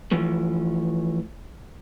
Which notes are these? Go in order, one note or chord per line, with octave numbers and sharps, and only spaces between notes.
E3 F3 A3